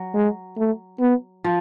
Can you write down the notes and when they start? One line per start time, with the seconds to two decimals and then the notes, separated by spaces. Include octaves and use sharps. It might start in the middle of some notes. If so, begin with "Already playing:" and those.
Already playing: F#3
0.14 G#3
0.57 A3
1.00 B3
1.44 F3